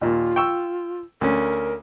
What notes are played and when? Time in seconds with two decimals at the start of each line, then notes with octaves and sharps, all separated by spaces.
0.01 D#2 A#2 F4
0.36 G5 C#6 E6
1.21 D2 C#4 A#4